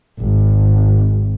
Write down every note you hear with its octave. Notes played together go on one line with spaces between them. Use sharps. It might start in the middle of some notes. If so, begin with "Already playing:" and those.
G#1